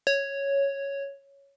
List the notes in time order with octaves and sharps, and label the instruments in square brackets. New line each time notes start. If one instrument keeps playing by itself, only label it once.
[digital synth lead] C#5